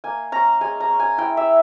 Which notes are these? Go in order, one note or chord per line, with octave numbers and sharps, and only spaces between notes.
A#3 G#5
C#4 A#5
G#3 G#5
A#5
C#4
G#5
E4 G5
E5